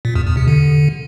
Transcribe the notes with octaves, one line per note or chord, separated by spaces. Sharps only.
A#2
E2
E2
C3
D3